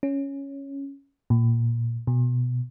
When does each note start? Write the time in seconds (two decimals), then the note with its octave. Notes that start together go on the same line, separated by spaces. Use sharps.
0.03 C#4
1.30 A#2
2.07 B2